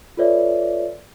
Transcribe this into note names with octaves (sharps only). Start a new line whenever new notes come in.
F4 A4 B4 C#5 D5 E5